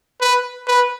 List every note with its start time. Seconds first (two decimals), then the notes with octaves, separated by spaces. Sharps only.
0.21 B4
0.67 B4